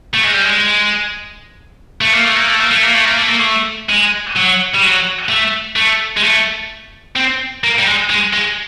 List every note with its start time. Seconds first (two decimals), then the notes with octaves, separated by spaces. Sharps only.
0.14 A3
0.24 G#3
0.34 G3
0.45 G#3
2.01 A3
2.13 A#3
2.24 A3
2.36 A#3
2.48 A3
2.59 A#3
2.71 A3
2.83 A#3
2.94 A3
3.06 A#3
3.17 A3
3.29 A#3
3.40 A3
3.89 G#3
4.36 F#3
4.74 G3
4.82 F#3
5.29 A3
5.76 A3
6.17 G#3
6.23 A3
7.16 C4
7.64 A#3
7.79 G3
7.87 G#3
8.10 G#3
8.33 G#3